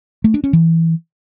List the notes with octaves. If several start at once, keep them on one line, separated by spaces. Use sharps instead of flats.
A3
D4
C#4
E3